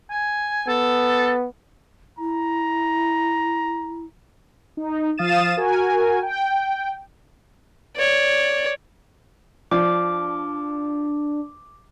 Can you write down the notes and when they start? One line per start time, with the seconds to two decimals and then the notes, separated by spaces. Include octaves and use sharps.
0.10 G#5
0.68 B3 A4
2.19 E4 A#5
4.77 D#4
5.18 F3 F5 D#6 A6 D#7 E7
5.57 F#4 A#4 G#5
6.23 G5
7.96 C#5 D5
9.71 F3 D4 D6